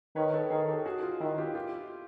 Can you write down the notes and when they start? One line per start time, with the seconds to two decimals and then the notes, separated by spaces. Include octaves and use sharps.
0.16 D#3 B4 C#5
0.33 A4 B4
0.50 D#3 G#4 A#4
0.68 G4 A4
0.86 F#4 G#4
1.03 F4
1.20 D#3 E4
1.38 F4 G4
1.55 F4 G4